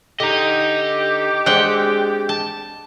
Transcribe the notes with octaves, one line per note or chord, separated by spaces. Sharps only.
D3 G4 D#5 A#5
G#3 C4 D4 F#5 G5
A5